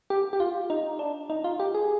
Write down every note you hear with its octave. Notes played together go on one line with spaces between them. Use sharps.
G4
G4
F4
D#4
D4
D#4
F4
G4
G#4